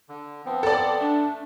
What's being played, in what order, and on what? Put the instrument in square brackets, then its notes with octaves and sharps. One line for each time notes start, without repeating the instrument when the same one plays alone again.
[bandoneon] D3
F3 B3 C4
[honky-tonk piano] A4 D5
[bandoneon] A3 [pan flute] D4